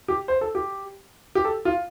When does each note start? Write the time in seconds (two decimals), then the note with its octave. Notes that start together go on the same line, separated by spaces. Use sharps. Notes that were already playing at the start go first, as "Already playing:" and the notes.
0.08 G4
0.28 C5
0.41 A4
0.55 G4
1.35 G4
1.45 A4
1.65 F4